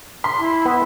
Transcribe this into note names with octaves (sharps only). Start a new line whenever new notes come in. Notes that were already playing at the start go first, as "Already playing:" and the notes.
C6 B6
E4
B3